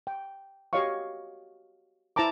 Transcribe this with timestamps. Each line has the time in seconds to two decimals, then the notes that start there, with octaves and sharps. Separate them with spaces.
0.07 G5
0.73 F#4 G4 C#5 D#5 F5 C#6
2.16 E4 C5 A5 A#5 D6